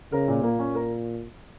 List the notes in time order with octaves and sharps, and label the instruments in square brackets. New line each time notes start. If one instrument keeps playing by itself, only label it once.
[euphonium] C#3 [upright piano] A#4
[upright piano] A#2
[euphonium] A#2 [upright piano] A#3
[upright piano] C#4
A#4